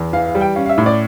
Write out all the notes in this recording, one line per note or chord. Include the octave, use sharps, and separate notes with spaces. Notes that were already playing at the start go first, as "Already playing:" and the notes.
Already playing: E2
E3 F5
F5
G3
G5
C#4 F5
F5
E5
A2
D5